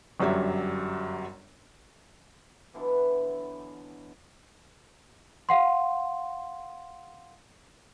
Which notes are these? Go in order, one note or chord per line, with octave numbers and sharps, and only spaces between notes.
G1 F#2 F#3 G3 E5
B2 D3 E3 F#3
F5 F#5 C6